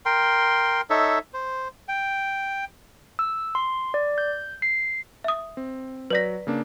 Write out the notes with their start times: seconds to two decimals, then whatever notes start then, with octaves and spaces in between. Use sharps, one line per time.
0.05 A#4 G5 C6
0.90 D#4 A4 C#5 E5
1.34 C5
1.88 G5
3.19 E6
3.55 C6
3.94 D5
4.18 G6
4.62 C7
5.24 E5 D#6
5.57 C4
6.10 F#3 B4 D5 A#6 B6
6.47 C#3 A#3 D4